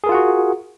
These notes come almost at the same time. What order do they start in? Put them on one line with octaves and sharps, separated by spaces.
G#4 A#4 F4 F#5 F#4